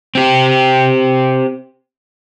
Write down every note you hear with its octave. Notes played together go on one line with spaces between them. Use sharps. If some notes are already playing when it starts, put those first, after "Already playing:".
C4 G4